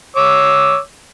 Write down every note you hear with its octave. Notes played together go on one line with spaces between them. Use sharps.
C#5 D6 E6